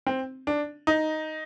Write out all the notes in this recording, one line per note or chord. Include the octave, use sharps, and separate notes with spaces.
C4
D4
D#4